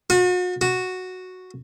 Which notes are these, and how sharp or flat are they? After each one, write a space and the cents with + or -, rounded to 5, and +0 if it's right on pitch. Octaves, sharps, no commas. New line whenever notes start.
F#4 -40
F#4 -5